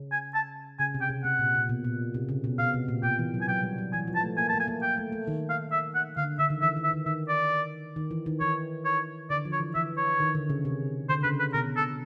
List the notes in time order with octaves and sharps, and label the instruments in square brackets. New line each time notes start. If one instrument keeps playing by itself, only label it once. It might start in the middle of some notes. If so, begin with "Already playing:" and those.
Already playing: [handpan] C#3
[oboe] G#5
A5
[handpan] C#3 [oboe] G#5
[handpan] C3
[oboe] G5
[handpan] C3
[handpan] C3 [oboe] F#5
[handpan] A#2
A#2
B2
A#2
C3
C#3
B2
[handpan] B2 [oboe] F5
[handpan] C3
A#2
[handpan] B2 [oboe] G5
[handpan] E3
F#3
[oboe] G#5
[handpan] F#3 [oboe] G5
[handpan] G3
F#3
[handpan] E3 [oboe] G#5
[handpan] F3
[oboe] A5
[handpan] A3
[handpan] A#3 [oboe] G#5
[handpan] A3 [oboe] A5
[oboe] G#5
[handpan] A#3
[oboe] G5
[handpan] A3
A3
D#3
[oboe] F5
E5
F#5
[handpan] D3 [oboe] F5
[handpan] D3 [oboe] E5
[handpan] D#3
[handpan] E3 [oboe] E5
[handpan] D#3
[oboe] E5
[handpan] D#3
[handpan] D#3 [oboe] E5
[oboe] D5
[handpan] D#3
E3
D#3
[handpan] E3 [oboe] C#5
[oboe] C#5
[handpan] D3 [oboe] D5
[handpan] F3
[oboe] C#5
[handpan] E3
[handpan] E3 [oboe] E5
[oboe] C#5
[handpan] D#3
D3
C#3
C3
[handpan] D3 [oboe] C5
[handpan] C#3 [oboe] B4
[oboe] B4
[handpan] B2 [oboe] A#4
[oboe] A4